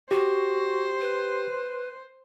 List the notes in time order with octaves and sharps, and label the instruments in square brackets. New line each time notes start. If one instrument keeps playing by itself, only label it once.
[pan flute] F#4 [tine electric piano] G4 [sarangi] C5
[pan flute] B4